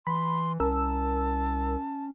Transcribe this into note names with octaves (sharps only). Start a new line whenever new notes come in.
E3 B5 C6
C2 C#4 A#4 A5 E6